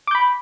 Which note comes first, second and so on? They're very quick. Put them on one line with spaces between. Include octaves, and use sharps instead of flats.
D6 G6 B5